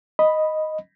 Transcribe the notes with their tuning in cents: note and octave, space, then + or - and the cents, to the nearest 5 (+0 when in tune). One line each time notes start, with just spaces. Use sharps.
D#5 +0 B5 +0